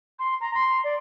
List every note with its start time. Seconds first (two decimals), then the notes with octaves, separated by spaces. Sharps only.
0.19 C6
0.41 A#5
0.54 C6
0.84 D5